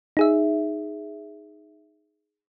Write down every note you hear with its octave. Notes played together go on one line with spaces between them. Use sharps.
D#4 G#4 E5